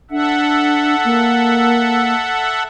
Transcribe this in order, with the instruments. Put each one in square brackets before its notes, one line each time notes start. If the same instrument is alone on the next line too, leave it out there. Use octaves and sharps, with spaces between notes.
[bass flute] D4 [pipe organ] A4 E5 F#5
[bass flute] A#3